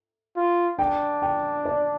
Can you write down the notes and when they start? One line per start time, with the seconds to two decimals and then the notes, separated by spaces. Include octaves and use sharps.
0.36 F4
0.79 D4 G5
1.22 G5
1.65 D5